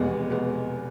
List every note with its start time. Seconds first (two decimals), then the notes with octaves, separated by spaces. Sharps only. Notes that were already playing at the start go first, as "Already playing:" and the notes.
Already playing: F1 E2 B2 G#3 B3
0.30 B2 G#3 B3